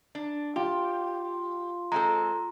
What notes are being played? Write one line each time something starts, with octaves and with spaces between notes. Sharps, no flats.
D4
F4 G4
G#3 C4 A4 A#5